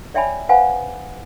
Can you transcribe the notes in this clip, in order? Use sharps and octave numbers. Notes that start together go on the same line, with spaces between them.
C#5 D5 E5 G5 G#5 B5
B4 C5 F5 F#5 G#5 B5